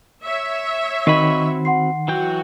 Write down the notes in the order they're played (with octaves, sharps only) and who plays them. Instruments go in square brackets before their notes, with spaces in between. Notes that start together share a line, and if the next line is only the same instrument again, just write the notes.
[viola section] C#5 E5
[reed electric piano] D#3 [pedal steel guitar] C4 F#4 B5 [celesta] D#5 C#6 D#7
[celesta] F#5 C6 C7
[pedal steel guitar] E3 F#3 G5 [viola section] F#4